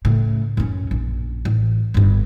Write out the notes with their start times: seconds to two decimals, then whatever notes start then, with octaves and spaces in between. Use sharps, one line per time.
0.05 A2 C#3
0.57 F#2 C#4
0.91 A#1
1.45 A1
1.94 G1 G2